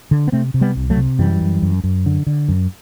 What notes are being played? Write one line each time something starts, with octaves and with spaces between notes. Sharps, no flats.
D3
B3
C3 A3 C4
C3
G3 B3
C2
F#3 A3
C3
F#2 E3 G3
F#2
F#2
F#2
D3
D3
F#2